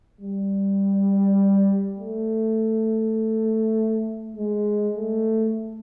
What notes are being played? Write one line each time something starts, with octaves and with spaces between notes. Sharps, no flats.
G3
A3
G#3
A3